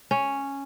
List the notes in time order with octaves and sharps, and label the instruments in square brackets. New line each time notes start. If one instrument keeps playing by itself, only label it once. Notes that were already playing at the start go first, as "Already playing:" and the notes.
[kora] C#4